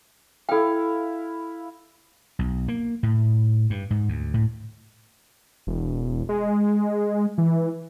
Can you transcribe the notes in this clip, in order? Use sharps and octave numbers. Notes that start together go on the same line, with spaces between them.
E4 A4 F5 G5
B1
A#3
A2
G2
G#2
D2
A2
E1
G#3
E3